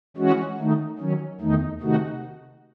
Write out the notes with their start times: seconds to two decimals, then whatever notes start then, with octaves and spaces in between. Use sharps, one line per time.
0.17 E3 G#3 C#4 F#4
0.58 D#3 A3 D#4
0.99 D#3 F#3 C#4
1.40 E2 D#3 A3 D#4
1.80 C3 D#3 A3 D#4 F#4